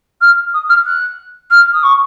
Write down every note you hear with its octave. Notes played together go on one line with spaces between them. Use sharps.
F6
D#6
F6
F#6
F6
D#6
C#6